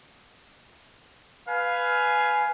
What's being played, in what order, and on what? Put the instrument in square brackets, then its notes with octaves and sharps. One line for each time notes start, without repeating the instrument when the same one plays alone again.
[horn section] B4 F5 G#5